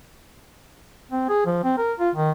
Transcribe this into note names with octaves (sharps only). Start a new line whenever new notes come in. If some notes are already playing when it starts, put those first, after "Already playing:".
C4
G#4
F3
C4
A#4
F4
D#3